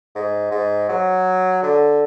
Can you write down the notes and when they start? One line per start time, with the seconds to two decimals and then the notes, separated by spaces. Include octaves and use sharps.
0.15 G#2
0.51 G#2
0.89 F#3
1.63 D3